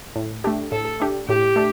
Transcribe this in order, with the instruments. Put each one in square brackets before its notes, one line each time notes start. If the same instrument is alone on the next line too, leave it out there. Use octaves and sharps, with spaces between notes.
[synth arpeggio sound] A2
A3 D4 G4
[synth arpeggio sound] A2 [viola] A4
[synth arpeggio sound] A3 D4 G4
[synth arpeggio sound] A2 [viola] G4
[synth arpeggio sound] A3 D4